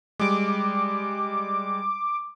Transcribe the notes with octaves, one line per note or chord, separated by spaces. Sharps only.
G3 G#3 D6